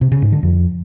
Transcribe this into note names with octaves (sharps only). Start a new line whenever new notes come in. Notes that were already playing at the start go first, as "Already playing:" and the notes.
C3
C#3
G#2
D3
F2